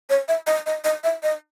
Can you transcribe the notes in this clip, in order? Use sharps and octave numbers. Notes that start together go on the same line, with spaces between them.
C#5
E5
D#5
D#5
D#5
E5
D#5